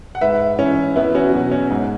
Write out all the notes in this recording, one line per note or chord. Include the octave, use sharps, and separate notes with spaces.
F#5
G#2 B4 E5
E3 C#4
E2 B3 E4
C#4 F#4
B2 F#3
C#4
G#2